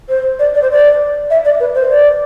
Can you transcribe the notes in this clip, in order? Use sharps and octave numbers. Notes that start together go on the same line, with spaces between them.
C5
D5
D5
C5
D5
E5
D5
B4
C5
D5